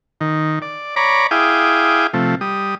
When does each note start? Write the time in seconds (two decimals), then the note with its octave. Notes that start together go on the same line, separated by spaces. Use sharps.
0.21 D#3
0.62 D5
0.96 C#5 D5 A#5 B5 D6
1.31 E4 G#4 F5 G5 D6 D#6
2.13 C3 F3 A3
2.41 G3 D#6